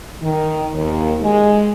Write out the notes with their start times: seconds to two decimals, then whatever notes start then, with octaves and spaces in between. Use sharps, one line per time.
0.22 D#3
0.74 D#2
1.22 G#3